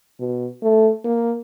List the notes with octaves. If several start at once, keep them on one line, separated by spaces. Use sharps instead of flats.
B2
A3
A#3